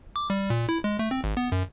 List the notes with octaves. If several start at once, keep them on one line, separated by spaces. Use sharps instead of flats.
D6
G3
A#2
E4
G#3
A3
C4
G#1
B3
F#2